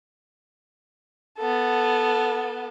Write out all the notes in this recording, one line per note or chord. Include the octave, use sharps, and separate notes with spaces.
B3 A4